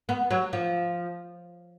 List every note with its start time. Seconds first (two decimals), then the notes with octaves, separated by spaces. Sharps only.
0.09 B3
0.31 F#3
0.53 F3